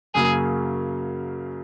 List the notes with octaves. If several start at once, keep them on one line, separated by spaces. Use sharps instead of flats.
F#2 C#3 F#3 A#3 G#4